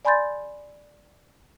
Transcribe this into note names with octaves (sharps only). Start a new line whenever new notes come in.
D5 G#5 B5 C6 G6 A6